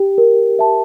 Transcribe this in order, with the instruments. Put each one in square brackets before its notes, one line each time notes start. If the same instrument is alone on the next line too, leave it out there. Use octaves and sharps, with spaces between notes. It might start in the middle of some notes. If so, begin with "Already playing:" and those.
Already playing: [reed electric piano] G4
[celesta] A#4
E5 A5